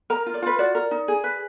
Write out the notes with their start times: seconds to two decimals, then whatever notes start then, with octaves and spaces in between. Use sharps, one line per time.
0.10 A#4 A#5
0.26 F4
0.34 D5
0.42 F4 B4
0.59 F#4 D5
0.75 A#4
0.91 D#4
1.08 G#4
1.24 B4